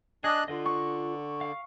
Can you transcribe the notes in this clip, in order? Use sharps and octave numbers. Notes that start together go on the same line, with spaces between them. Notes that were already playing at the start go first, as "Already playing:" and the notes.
D4 G#4 D#5 D#6 F#6
D3 F4 B4 D#5
C#6
F5